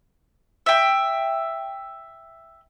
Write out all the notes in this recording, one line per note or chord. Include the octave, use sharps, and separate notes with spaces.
E5 G5